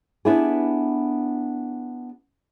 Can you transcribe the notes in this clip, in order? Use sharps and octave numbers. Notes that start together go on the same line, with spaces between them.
B3 D4 E4 G4 G#4